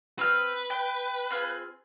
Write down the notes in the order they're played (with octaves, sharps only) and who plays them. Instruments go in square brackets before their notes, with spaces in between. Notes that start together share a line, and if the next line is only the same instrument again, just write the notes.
[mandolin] C4 F6 G6 [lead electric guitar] B4
[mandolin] G5
C4 F4 G#4